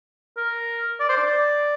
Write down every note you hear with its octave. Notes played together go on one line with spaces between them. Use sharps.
A#4
D5
C5
D5